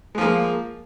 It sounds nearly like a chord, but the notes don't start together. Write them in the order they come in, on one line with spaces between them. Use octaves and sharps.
G#3 F3 A#3